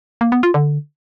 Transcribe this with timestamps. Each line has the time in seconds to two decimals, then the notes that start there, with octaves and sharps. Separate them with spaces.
0.21 A#3
0.32 B3
0.43 F4
0.54 D3